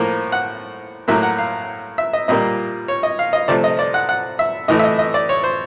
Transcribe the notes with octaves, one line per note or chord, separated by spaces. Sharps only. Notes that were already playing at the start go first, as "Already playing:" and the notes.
Already playing: A2 F3 A#3
F#5
A2 F#3 A#3 E5
F#5
F5
E5
D#5
A#2 G3 A#3 D#5
C#5
D#5
F5
D#5
C3 F3 A3 D5
D#5
D5
F#5
F#5
E5
A2 E3 A3 D#5
E5
D#5
D#5
D5
C#5
C5